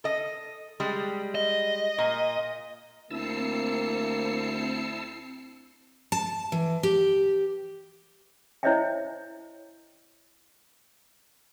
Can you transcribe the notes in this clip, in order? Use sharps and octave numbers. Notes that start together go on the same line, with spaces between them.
A4 D#5
G3 G#3
D#5
A#2
D2 A#3 C4 E4 A5 E6 C7 C#7
A5
E3
G4
E4 C5 C#5 D#5 E5 G5